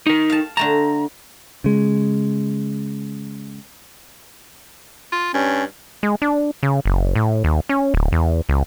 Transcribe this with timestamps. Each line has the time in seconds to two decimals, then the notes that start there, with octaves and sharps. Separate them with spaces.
0.06 D#4 A#4
0.30 F5 A5
0.57 D3 A3 A5 A#5
1.64 C#3 G#3
5.12 F4
5.34 G2 C#4
6.03 G#3
6.22 D4
6.63 C#3
6.86 F#1
7.15 A2
7.44 D#2
7.69 C#4
7.94 D1
8.12 E2
8.49 C#2